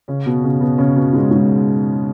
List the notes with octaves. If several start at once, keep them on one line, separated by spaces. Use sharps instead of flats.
C#3 C#4
B2 B3
C#3 C#4
B2 B3
C#3 C#4
B2 B3
G#2 G#3
G#2 G#3